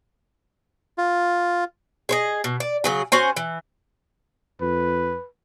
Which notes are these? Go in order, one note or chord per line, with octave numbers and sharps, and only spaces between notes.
F4
G#4 C5 D#5
B2
D5
C#3 F#3 G#4
C#4 F#4 C5 G#5
E3
F2 B4